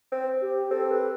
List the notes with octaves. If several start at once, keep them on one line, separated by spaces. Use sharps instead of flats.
C4
G4
C4 A4
B4